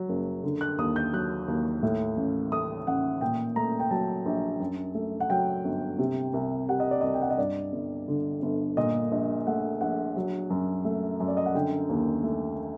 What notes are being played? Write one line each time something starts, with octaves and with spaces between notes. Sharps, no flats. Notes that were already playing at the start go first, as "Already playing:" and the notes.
Already playing: F#3
F#1
D3
F#6
D#2 D#6
G6
F#3 F#6
D#2
A2
A1
A3 D#6
A1 F#5
A#2 G5
A3 A#5
G5
F#3 A5
A#1
F#2
A3
F#5
F#3 G5
G1
C3
C2
G3 F#5
D#5
D5
C2 D#5
G5
F#5
D#5
G2 D5
G1
D3
G1
A#2 D#5
A#1 D#5
A3 F#5
A#1 F#5
F#3
F#2
A3
F#2
D5
D#5
F#5
D3 G5
D#2
A3